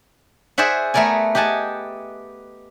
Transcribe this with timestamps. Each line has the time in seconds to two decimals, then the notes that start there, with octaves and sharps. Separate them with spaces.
0.58 G#4 C5 D5 E5 F#5
0.94 A3 B3 A#4 D5 G#5
1.35 G4 D#5 F#5 G#5 A5